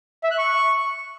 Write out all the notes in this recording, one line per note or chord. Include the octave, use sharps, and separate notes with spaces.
E5
F#6
C#6